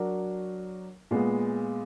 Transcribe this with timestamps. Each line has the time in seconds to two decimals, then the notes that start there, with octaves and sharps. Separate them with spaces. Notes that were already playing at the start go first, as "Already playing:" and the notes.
Already playing: F#3 D4 F#4 A#4
1.11 A#2 G#3 B3